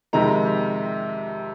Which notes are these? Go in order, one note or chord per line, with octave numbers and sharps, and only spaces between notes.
F2 C3 D#3 G#3 A#5